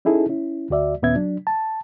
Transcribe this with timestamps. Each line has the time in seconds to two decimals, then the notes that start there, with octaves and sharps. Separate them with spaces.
0.05 C#4 D#4 E4 G#4 A4
0.29 C#4 E4
0.70 D2 F#4 D5 E5
1.02 D#2 A#2 B3 C#4 E5 G#6
1.16 F#3 D4
1.47 A5